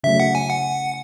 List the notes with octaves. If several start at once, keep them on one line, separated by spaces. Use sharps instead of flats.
C#3 F#3 A3 E5
F#5
G#5
F#5